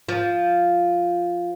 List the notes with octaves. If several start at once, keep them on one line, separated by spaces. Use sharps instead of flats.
F3